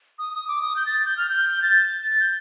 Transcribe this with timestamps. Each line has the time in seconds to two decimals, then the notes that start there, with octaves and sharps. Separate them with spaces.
0.19 D#6
0.33 D#6
0.48 D6
0.62 D#6
0.76 G6
0.86 A6
1.05 G6
1.17 F6
1.30 G6
1.62 A6
2.20 G6